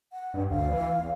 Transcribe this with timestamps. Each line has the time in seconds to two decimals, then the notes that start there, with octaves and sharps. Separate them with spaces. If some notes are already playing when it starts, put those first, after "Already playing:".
0.13 F#5
0.34 G2
0.50 D2 F5
0.71 E3
0.99 E2